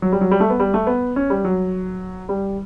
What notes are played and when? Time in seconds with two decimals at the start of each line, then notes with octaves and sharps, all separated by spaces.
0.02 F#3
0.12 G3
0.21 F#3
0.31 G3
0.40 A3
0.50 B3
0.60 G3
0.74 A3
0.87 B3
1.16 C#4
1.30 G3
1.45 F#3
2.29 G3